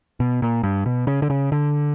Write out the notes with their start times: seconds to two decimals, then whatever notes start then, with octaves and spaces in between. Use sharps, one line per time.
0.20 B2
0.42 A#2
0.63 G2
0.86 B2
1.07 C#3
1.22 D3
1.30 C#3
1.52 D3